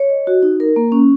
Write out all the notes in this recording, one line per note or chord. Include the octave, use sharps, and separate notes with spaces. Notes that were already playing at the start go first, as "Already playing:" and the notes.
Already playing: C#5
D#5
F#4
D#4
A#4
A#3
C#4